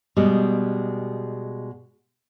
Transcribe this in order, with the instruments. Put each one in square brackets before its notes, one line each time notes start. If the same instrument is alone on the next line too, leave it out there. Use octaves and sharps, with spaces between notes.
[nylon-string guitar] B2 G3 G#3